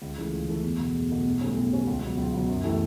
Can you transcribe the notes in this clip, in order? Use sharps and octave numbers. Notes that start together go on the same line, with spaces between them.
C#2
C#3 E3 A3
C#2
C#3 E3 A3
E2
B2 A3
E2
B2 A3
B1
A2 G3 C#4
B1
A2 G3 C#4
C#2
B2 F#3
C#2
B2 F#3
F#2
E3 A3 E4 G4